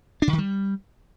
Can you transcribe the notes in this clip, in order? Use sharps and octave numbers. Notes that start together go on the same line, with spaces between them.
D4
C#3
D#3
G3